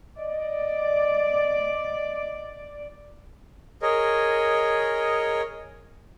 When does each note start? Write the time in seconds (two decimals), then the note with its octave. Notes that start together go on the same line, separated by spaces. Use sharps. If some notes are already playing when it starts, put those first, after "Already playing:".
0.18 D5 D#5
3.82 G#4 A#4 C#5 D#5